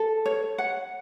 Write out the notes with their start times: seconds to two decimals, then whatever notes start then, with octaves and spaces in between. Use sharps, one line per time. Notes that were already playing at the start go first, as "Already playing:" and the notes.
Already playing: A4
0.26 C#5
0.58 F#5